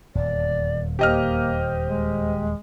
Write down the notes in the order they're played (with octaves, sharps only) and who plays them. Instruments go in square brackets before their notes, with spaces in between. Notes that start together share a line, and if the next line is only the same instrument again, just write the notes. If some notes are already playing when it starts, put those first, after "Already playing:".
[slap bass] D#1 E2 [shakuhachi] D5
[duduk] A#3 [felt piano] G4 D#5 F6 [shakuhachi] C5
[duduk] G#3